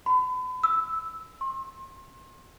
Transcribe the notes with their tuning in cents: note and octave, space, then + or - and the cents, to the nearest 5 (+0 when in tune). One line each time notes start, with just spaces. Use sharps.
B5 +40
E6 -10
C6 +35